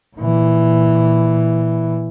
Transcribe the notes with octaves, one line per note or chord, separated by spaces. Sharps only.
A#2 E3